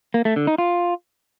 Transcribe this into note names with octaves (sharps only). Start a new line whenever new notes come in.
A#3
A3
D3
D#4
F4